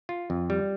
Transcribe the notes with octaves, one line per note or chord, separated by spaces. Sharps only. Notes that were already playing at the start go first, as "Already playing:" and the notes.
F4
F2
G3